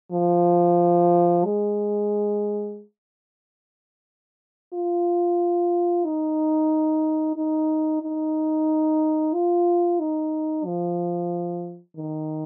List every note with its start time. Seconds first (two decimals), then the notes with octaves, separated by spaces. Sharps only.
0.12 F3
1.45 G#3
4.73 F4
6.05 D#4
7.36 D#4
8.02 D#4
9.34 F4
10.00 D#4
10.65 F3
11.96 D#3